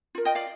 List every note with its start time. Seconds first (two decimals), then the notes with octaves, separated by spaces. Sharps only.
0.15 F4 A#4
0.25 D#5 G5
0.35 D5 F5